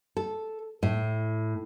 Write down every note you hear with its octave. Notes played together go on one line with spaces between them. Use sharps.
A4
A2